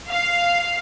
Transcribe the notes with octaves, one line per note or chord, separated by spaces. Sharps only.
F5